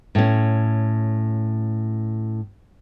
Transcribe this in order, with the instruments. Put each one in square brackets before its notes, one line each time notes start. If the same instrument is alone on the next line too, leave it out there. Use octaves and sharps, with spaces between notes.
[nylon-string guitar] A2 C#4